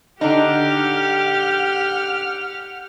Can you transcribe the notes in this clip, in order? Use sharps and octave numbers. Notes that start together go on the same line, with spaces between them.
D3 D4 D#4 G4 F#5 F6